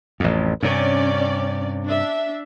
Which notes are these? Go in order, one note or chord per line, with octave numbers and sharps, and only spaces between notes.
A1 F2
G2 C3 C#4 D5
D4 E5